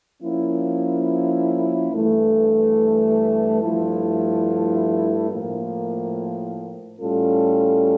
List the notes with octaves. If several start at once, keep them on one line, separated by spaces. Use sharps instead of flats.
F3 A#3 C#4 E4
G2 E3 A3
G2 F3 A3 E4
A2 F3 A#3
A2 G3 C#4 F4 A4